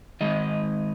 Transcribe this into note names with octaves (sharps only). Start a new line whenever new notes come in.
G#2 D#3 G#3 D#5